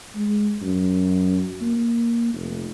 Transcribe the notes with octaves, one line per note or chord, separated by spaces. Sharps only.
G#3
F#2
A#3
F1